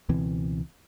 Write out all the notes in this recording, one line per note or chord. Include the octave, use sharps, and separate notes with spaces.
C#2 B2 E3 C4